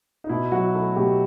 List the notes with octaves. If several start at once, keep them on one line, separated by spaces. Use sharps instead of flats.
D#4
B2 E4
F#3 F#4
A3 E4
B2 G4